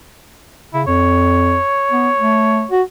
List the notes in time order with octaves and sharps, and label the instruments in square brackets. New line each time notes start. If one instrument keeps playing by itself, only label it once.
[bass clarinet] C#3 [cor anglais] E4
[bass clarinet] F2 [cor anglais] C#5
[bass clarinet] B3
A3
F#4